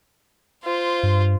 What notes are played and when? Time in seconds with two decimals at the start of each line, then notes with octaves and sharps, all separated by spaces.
0.64 F4 C5
1.03 G2